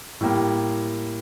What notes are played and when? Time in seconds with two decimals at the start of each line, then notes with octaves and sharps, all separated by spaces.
0.21 A2 G3 A#3